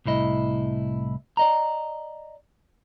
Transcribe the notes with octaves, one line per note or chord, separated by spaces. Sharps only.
C2 A2 E4 D#5
D5 D#5 A#5